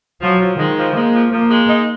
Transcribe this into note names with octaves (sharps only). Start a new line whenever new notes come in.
F3 F#3
F3
D#3 G#3
F3
G#3 A#3
F3
F3 A#3
G#3
D#4